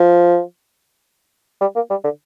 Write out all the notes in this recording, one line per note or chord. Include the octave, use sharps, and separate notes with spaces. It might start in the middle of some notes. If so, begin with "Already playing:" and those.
Already playing: F3
G3
A#3
G3
D3